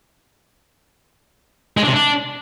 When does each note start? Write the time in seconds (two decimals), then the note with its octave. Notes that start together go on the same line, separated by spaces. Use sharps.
1.77 G#3
1.82 D4
1.88 C3
1.93 D4